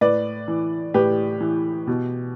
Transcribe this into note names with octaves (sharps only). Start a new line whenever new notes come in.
A2 B4 D5
E3
A2 G4 B4
E3
B2